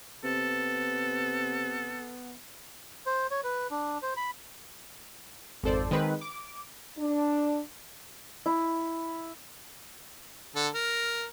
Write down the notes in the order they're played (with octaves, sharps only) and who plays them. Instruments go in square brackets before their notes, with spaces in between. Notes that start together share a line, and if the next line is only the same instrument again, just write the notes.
[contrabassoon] C3 [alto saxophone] B3 [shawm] A4
[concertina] C5
C#5
B4
D4
C5
B5
[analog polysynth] G#1 F2 A4 C5 D5
D#3 G#3 C4 B4
D6
[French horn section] D4
[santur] E4
[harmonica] D3 A4
A#4